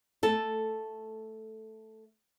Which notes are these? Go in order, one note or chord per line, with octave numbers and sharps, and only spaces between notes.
A3 A4